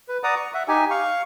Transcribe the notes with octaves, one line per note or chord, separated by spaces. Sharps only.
B4
D5 F#5 A#5 D#6
C#6
E5 F#5
D#4 G4 G#5
F5 C#6